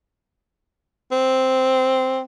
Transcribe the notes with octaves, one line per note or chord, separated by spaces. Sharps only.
C4